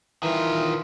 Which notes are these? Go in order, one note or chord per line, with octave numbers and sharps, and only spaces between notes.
D#3 E3 F4